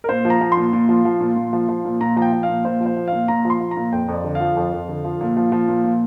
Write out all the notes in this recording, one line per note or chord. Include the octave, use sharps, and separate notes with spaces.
A#4
A#2 C5
F3
A#5
F3
C6
A#2
A#2
F3
F3
A#2
A#2
F3
F3
A#2
A#2 A#5
F3 A#5
G5
F3
F5
A#2
A#2 C5
F3
C5
F3
A#2 F5
A#2 A#5
F3
C6
F3
A#5
A#2
F2 G5
F2
D5
D3
F5
F3
F2
F2
D3
F3
A#2
F3
F3
A#2
A#2